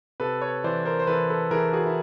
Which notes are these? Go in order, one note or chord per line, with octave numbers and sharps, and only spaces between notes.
C3 A4 B4
B4 C#5
E3 C5 D5
A#4 C5
C5
E3 A4 B4
A4 B4
E3 G#4 A#4
F#4 G#4
E4